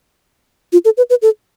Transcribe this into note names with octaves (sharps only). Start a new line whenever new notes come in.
F4
A4
B4
B4
A4